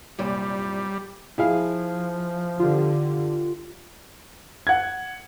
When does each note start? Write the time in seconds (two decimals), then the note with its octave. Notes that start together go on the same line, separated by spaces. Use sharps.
0.19 C2 F#2 A#2 G3
1.38 F3 E4 G#4 F5
2.59 D3 F4 G4
4.67 F#5 G#6